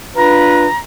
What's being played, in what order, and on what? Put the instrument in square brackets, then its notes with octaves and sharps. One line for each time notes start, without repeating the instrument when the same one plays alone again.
[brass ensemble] D4 F4 B4 [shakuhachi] A#5